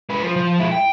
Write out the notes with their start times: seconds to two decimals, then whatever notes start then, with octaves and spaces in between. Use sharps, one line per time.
0.10 G#3 B4
0.23 F3
0.36 F3
0.60 G#3 E4
0.72 G5